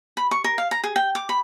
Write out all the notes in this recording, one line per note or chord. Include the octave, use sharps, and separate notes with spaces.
B5
C#6
A#4
F5
A#5
G#4
G5
D6
B5